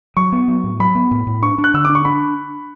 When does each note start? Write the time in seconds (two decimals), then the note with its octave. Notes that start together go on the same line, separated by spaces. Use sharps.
0.17 F#3 C#6
0.32 B3
0.48 F#3
0.64 A2
0.80 F#3 B5
0.95 B3
1.11 A2
1.27 A2
1.43 D4 C#6
1.58 D4
1.64 F#6
1.74 D3 E6
1.85 D4 D6
1.95 C#6
2.05 D4 B5